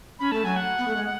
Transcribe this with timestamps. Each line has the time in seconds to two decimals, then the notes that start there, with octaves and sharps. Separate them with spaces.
0.19 C#4 B5
0.32 A3 A5
0.45 F#3 G#5
0.56 F#5
0.78 B3
0.88 A3
0.96 G#3
1.05 F#5